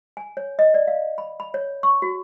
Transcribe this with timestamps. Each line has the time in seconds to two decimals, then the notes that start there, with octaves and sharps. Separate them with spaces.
0.17 G#5
0.37 C#5
0.59 D#5
0.74 D5
0.87 F5
1.18 B5
1.40 B5
1.54 C#5
1.83 C#6
2.02 F#4